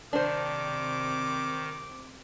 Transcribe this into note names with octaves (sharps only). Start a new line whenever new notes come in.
C3 D#3 C4 D4 C5 D6